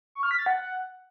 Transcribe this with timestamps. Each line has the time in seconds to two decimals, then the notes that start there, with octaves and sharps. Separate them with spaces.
0.15 C#6
0.23 F6
0.31 B6
0.39 A6
0.46 F#5